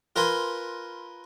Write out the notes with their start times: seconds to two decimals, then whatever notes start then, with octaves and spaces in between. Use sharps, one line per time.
0.16 F4 A#4 B4 G#5 C6